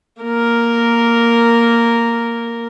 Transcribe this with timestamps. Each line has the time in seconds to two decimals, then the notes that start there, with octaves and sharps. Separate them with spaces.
0.22 A#3 A#4